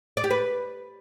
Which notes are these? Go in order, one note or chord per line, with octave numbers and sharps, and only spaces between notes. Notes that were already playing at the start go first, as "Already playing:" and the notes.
D5
G4
B4